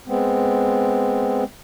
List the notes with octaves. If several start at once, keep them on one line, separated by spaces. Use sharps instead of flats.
G#3 B3 C4